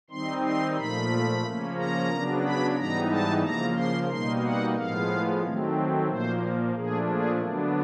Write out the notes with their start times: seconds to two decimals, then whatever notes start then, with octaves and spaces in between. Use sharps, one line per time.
0.10 D#3 G3 C4 D#4 C6
0.44 C6
0.77 A#2 F3 A3 B5
1.43 C#3 F3 A#3 C#4
1.77 A#5
2.10 C#3 F#3 B3 D4
2.43 B5
2.76 G#2 E3 G3 B3 D#4 A#5
3.10 A5
3.43 C#3 F3 A#3 A#5
3.76 C6
4.09 B2 G3 A#3 D#4 C6
4.42 F#5
4.76 A2 F3 G#3 B3 F5
5.42 D#3 F#3 A3 C4
6.08 A#2 F3 A#3 C5
6.75 A#2 F3 A3 D4 G#4
7.08 G#4
7.41 D3 F#3 B3 D4